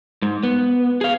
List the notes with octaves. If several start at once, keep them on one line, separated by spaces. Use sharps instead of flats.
G#2
B3
G#4 F5